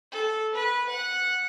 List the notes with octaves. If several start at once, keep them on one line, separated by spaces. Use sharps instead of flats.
A4
B4
F#5